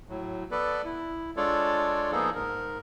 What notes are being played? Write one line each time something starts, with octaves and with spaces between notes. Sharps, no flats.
A2 F#3
B3 A4 B4 D5
E4
G#3 D4 F4 A4 C#5 D5
F3 A#3 B3 D#4 G#4 A4
G#2 A#4